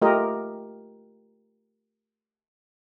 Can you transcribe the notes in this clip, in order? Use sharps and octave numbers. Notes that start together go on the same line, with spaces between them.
A3 F4 G4 A#4 D#5